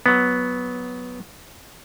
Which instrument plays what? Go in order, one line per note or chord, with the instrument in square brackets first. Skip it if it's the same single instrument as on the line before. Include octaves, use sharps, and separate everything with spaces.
[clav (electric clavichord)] F#3 B3